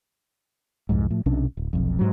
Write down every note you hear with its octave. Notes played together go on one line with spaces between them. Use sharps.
C2 F2 G#2
A2 F3
B1 C3 C#4 D4
D1
F1 B1 F2
G#2 F#3